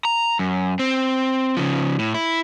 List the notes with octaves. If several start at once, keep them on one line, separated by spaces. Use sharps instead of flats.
A#5
F#2
C4
C#3 F3
A2
E4